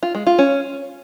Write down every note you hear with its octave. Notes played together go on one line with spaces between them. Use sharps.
F4
G#3
F4
C#4